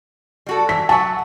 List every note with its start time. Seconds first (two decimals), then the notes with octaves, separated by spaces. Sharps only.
0.47 G3 F#4 A4
0.69 E3 B6
0.89 F#3 E5 F#5 A5 C#6